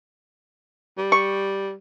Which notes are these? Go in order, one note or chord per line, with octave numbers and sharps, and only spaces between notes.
G3
C#6